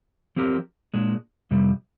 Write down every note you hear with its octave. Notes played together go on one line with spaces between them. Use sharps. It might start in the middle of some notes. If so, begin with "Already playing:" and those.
F3 C4 G4 A#4
A#2 G#3 D4
F2 C3 G3